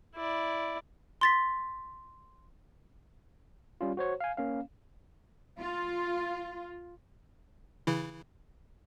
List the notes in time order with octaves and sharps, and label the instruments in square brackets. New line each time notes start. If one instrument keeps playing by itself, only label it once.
[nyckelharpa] E4 D5
[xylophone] C6 A6 B6
[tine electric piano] G3 C#4 F4
F#4 C5 C#5
F5 G#5
A#3 C#4 F5
[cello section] F4
[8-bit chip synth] C#3 E3 E4